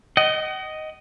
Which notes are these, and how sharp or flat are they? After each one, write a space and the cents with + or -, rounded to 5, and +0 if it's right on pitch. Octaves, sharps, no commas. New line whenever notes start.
D#5 +0 F#5 +45